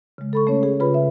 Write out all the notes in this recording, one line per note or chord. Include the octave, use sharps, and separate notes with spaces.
C#3 G#3
A4 B5 C#6
A3 C#4 C#5
G#4
C#3 F4 G#4 B4 B5
E5